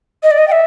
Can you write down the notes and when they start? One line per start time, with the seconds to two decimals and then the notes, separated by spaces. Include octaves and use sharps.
0.23 D#5
0.31 D5
0.38 D#5
0.47 G5
0.51 E5